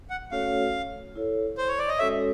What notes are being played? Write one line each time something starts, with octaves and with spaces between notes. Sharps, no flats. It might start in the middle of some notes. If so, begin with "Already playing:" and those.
F#5
A3 C#4 F#4 A4 C#5 F5
E4 A4 C#5
C5
C#5
D5
D#5
G#3 C#4 F#4 A4 C#5 E5